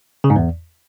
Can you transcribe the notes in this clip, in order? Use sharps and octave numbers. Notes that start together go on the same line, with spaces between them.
C#3
G#2
E2